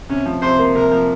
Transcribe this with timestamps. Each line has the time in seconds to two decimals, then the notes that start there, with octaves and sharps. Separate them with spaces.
0.09 C3 C#4
0.26 F3
0.42 C3 C5
0.59 A#3
0.75 C3 A#4
0.92 F3